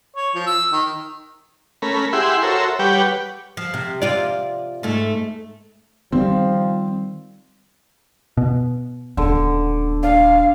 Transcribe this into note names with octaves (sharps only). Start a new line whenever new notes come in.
C#5
F3
E6
D#3
A3 C#4 A#4 B5
E4 G4 G#4 E5 F#5 C6
F#4 A4 A#4 C5 C#5 E5
G3 G4 B4 C#5 F#5 G5
F3
C3
C3 F4 D5
G#2 A3
D#3 F3 G3 C4
B2
D#1 D3 B3
D4 F5